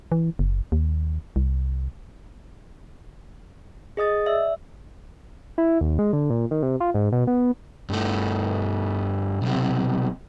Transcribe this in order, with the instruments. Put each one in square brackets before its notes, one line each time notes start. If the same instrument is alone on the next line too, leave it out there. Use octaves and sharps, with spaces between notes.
[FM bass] E3
F#1
D#2
C2
[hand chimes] G#4 D#5 D#6 A6
D5 E5 E6
[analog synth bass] E4
D#2
G#3
D3
A#2
D#3
C3
F4
G#2
B2
B3
[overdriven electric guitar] G2 A3
B1 C3